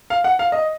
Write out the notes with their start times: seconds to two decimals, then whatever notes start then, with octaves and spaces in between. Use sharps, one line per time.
0.10 F5
0.24 F#5
0.39 F5
0.52 D#5